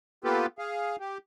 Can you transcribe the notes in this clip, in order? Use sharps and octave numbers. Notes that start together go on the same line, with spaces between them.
A#3 B3 F4 G4 A4 B4
G#4 F5
G4